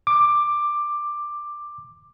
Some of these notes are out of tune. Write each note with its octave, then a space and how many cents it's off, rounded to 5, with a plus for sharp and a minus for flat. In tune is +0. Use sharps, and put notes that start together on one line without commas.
D6 +10